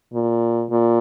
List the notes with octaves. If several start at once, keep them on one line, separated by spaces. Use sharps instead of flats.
A#2
A#2